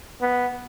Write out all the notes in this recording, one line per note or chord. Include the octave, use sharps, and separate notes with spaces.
B3